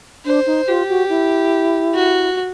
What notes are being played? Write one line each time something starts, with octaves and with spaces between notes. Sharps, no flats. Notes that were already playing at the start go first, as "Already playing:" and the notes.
D4 C5
D#4
F4 G4
F#4
E4
F#4